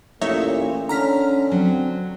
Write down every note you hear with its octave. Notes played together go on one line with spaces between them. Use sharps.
A1 A#2 A3 D#4 C#5 E5
D3 C#4 A#5 F6 B6
F#3 C4